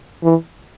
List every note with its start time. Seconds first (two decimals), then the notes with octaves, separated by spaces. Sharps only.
0.24 E3